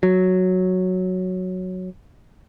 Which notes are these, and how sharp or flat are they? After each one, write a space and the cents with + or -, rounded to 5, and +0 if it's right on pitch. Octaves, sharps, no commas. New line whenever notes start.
F#3 -5